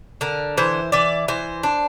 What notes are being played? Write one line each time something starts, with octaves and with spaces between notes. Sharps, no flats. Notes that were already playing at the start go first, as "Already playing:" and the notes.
D3 A#4
E3 C5
E3 D5
E3 C5
D4